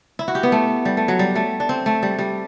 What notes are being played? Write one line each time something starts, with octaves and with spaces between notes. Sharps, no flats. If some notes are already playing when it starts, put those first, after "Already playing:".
E4
F#4
G4
B3
A3
G3
A3
F#3
G3
A3
D4
C4
A3
G3
G3